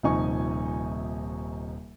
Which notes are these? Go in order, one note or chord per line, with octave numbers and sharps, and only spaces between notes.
D#1 C3 F3 D#4 G#5 C#6